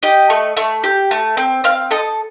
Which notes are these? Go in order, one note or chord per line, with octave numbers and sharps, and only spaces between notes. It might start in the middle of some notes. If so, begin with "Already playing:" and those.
G4 D#5
A3
A3
G4
A3
C4
C4 F5
A4 D#5